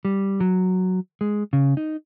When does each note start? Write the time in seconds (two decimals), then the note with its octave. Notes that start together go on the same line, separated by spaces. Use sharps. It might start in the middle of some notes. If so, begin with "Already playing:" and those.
0.05 G3
0.40 F#3
1.21 G#3
1.53 C#3
1.77 D#4